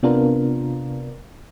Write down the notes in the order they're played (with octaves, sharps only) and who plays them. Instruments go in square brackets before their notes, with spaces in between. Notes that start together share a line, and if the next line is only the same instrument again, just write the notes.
[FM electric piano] C3 B3 D4 F4 A#4